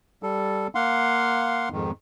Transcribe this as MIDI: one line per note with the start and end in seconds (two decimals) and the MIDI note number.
0.23 0.67 55
0.23 0.67 69
0.75 1.69 58
0.75 1.69 77
0.75 1.69 78
0.75 1.69 84
1.72 1.91 41
1.72 1.91 44
1.72 1.91 51